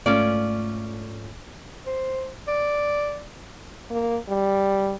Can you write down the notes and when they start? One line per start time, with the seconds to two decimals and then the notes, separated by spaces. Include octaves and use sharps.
0.06 G#2 A3 C#4 F4 D5
1.86 C5
2.48 D5
3.91 A#3
4.29 G3